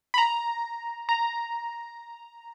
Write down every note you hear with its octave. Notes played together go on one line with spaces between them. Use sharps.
B5
A#5
A#5